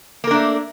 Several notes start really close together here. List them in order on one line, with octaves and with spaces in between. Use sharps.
A#3 A#4 D4 A3